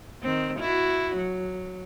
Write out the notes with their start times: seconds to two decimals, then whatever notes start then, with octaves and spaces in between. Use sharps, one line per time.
0.22 D#3 C4
0.60 E4 F#4
1.17 F#3